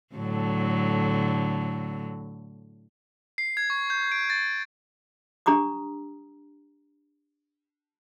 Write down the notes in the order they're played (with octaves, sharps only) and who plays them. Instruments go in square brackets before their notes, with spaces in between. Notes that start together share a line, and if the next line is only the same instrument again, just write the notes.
[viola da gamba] A2 D3 F#3
[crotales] C7
G#6
C#6
G6
D7
A6
[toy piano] D4 G4 A#5 D6 D#6